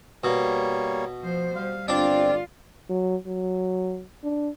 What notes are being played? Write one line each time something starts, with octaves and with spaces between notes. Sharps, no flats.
B2 G3 A#3 C#5
F3 C5
G3 F5
G1 C4 D4 F4 D5
F#3
F#3
D4